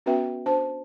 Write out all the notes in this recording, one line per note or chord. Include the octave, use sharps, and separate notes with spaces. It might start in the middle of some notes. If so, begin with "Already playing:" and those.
B3 C#4 F#4 B4 E5 G5
D4 C5 A5